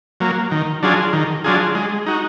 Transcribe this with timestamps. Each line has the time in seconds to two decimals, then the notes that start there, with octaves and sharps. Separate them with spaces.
0.20 F#3 A#3
0.51 D#3
0.83 F#3 D4 F4 G#4
1.13 D#3
1.44 F#3 D4 F4 G#4
1.75 G#3
2.06 D#4 F#4